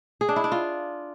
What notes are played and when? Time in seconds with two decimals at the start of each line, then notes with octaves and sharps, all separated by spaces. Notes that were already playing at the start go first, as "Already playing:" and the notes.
0.21 G#4
0.29 D4
0.36 E4
0.44 D4
0.52 F4